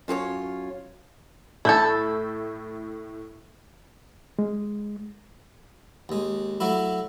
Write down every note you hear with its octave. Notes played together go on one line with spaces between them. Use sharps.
F#2 F4 G#4 C#5
A2 E4 A4 G6
G#3
D#2 G#3
F#3 A3 E4